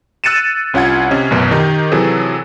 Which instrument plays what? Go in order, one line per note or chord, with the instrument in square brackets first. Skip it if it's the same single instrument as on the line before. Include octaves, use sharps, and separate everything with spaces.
[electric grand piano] E6 F#6 A6 C#7 D#7 E7
C2 C#4 F4 F#5 G#6
C3 C#4 D#5
A1 F#2 B2
D#3 D#4 G4
C3 E3 F#3 G#4 A4